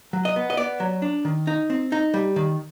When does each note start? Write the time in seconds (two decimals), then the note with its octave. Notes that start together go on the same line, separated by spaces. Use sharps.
0.13 F#3
0.25 D#5
0.36 B3
0.50 D#5
0.57 B3 D5
0.80 F#3
1.02 D4
1.25 D#3
1.47 D#4
1.70 C4
1.92 D#4
2.14 G3
2.36 D#3